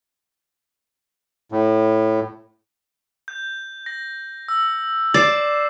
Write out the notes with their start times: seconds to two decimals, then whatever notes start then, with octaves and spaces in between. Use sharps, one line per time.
1.52 A2
3.28 G6
3.86 A#6
4.48 E6
5.14 D5 D6 C7 E7